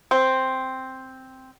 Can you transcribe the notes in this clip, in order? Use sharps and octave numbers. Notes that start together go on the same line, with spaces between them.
C4